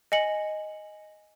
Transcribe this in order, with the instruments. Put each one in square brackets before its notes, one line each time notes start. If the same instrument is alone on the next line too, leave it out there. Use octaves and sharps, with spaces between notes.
[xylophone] D#5 G#5 C#7 F#7